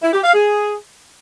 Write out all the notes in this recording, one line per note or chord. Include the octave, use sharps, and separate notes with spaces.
E4
G4
F5
G#4